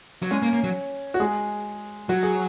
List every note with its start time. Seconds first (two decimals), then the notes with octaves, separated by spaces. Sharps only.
0.22 F#3
0.31 G#3 C#4 C#5
0.42 A#3
0.53 A#3
0.64 F#3
1.14 F#4
1.20 G#3 G#4
2.09 F#3 F#4
2.23 G#4